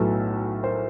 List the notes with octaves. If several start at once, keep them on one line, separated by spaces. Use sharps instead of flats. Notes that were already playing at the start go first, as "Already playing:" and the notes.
Already playing: B1 A2 F#3 B3 A4
A#4 C5